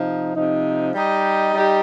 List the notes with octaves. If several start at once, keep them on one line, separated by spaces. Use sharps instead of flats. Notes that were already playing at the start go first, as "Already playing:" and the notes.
Already playing: C3 F3 D#4
C3 F3 D#4
G3 D#4 G4 D#5
G3 D#4 G4 D#5